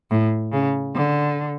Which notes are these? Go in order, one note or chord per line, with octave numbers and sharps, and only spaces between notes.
A2
C#3
D3